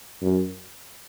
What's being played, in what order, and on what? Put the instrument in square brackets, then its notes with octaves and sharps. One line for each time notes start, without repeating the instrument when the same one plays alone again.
[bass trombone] F#2